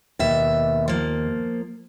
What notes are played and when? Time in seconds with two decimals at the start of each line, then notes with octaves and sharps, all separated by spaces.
0.19 D#2 B2 E5
0.88 F3 A#3